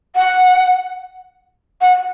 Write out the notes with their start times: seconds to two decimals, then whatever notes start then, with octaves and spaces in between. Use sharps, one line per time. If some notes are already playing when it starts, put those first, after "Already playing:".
0.16 F#5
1.81 F#5